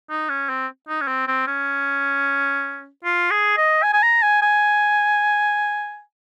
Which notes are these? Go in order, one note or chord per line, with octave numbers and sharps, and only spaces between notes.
D#4
C#4
C4
D#4
C#4
C4
C4
C#4
F4
G#4
D#5
G#5
G#5
A#5
G#5
G#5